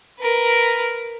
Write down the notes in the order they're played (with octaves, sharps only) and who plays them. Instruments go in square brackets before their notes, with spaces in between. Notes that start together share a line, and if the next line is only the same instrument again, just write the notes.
[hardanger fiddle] A#4 B4